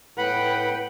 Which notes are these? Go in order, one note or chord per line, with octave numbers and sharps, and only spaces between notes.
A2 B4 F#5 G5 B5